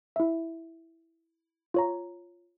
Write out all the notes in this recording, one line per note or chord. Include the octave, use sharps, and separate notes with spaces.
E4 E5
F4 C#5 A#5